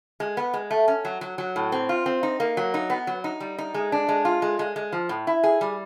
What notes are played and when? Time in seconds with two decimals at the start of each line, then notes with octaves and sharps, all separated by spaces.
0.20 G#3
0.37 B3
0.54 G#3
0.71 A3
0.88 C#4
1.05 F#3
1.21 F#3
1.38 F#3
1.56 A2
1.72 C4
1.89 F4
2.06 C4
2.23 D#4
2.40 A#3
2.57 F#3
2.74 D#4
2.90 B3
3.07 F#3
3.24 D#4
3.40 G3
3.58 D#4
3.74 G#3
3.92 D4
4.08 G#3
4.25 F4
4.42 G#3
4.59 G#3
4.76 G#3
4.92 F3
5.09 A2
5.27 E4
5.44 G#4
5.61 G3